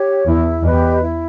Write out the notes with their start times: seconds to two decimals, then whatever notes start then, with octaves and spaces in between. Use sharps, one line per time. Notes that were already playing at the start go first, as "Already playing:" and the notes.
Already playing: G4 C#5
0.26 E2 E4
0.63 E2 G4 B4 D#5
1.01 E4